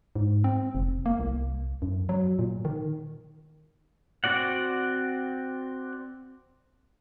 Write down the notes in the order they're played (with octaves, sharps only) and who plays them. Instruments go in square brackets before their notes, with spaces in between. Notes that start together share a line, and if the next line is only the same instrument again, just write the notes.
[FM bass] G#2
C4
F1
A#3
C2
F#2
F#3
A#2
D#3
[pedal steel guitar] C4 F#4 D5 F#5